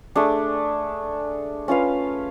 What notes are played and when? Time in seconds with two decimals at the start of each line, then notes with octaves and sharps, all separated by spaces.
0.15 A3 D4 G#4 D5
1.68 C#4 F4 B4 F5